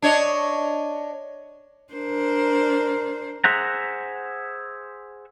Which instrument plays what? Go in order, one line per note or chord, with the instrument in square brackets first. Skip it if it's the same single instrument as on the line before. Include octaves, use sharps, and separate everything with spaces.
[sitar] D4 C#5 D#5
[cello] D4 C5 [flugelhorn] A#4
[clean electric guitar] G#4 C5 E5 F#5 A#5